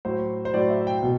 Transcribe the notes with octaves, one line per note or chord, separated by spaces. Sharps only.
A2 F#3 C5
C5
A2 F#3 D5
E5
G5
B2